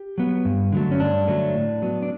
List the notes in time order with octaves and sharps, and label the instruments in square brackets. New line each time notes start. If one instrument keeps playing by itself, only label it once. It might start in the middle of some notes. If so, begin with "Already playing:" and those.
Already playing: [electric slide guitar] G4
F#3 B3
G2
D3 F#3 A3
C#4
G2 D4
D3 F#3 A3
A2
F#3 B3
D4